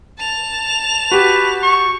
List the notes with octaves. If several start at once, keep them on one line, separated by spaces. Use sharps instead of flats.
A5 F7
F#4 G4 B4
C#6